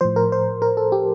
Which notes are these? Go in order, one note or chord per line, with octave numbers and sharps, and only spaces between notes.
A2 F3 C5
A#4
C5
A#4
A4
G4